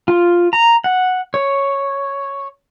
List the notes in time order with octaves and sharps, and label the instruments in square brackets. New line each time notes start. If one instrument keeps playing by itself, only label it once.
[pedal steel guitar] F4
A#5
F#5
C#5